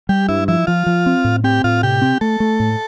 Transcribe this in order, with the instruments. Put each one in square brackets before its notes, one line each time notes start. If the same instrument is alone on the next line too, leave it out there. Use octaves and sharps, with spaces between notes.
[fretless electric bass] G3 [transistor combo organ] G4
[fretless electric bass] G2 [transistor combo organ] E4
[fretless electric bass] F3 [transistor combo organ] E4
[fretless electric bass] F3 [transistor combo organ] F4
[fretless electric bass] F3
C4
A2
[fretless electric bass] C4 [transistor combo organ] G4
[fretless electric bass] A2 [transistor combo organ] F4
[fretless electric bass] C3 [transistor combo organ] G4
[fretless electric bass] C4
[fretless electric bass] A3 [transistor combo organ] A4
[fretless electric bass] A3
A2